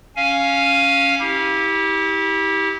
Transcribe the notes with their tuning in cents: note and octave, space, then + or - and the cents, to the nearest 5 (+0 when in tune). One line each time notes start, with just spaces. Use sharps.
C#4 +0 F5 +0 G#5 +0
E4 -35 G4 +0